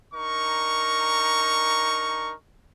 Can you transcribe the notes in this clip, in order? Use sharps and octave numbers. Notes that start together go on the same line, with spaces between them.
D4 D#4 A#4 C#6